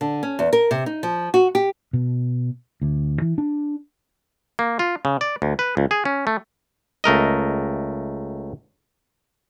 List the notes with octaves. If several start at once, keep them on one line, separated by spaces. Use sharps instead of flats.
D3
C#4
E2
A#4
C3
D#4
F3
F#4
G4
B2
D2
E3
D4
A#3
F4
C#3
D5
D2
B4
C#2
G#4
C#4
A3
C#2 A3 A#4 D#5